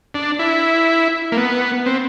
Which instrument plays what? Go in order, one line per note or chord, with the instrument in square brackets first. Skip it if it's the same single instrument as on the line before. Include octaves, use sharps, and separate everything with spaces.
[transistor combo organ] D4
E4
A#3
B3
C4